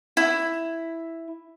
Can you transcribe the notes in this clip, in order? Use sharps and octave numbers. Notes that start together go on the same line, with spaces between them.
E4